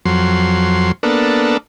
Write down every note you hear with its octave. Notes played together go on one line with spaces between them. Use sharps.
F2 F#3 C6
A#3 B3 D4 A4